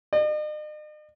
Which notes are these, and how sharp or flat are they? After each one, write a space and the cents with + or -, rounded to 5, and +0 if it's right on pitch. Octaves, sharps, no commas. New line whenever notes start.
D#5 -45